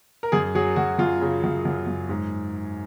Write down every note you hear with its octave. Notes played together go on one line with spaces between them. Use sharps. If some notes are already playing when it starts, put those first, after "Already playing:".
A#4
F#2 G#4
F#3 G#4
F#2 F#4
F#2 F4
C#3
F#2
F#2
F#2
G#2